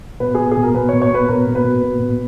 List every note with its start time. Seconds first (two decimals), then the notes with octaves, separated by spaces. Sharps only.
0.20 B2 B4
0.35 B2 G#4
0.52 G#4
0.57 B2
0.63 A#4
0.74 B2 B4
0.89 C#5
0.93 B2
1.02 C#5
1.11 B2 B4
1.28 B2 A#4
1.47 B2
1.55 B4
1.64 B2
1.83 B2
2.00 B2